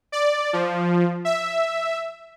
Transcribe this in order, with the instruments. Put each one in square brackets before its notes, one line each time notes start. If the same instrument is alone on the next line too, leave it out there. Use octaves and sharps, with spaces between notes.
[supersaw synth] D5
F3
E5